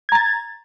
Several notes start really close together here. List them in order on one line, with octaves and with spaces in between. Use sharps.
G#6 A#5 A6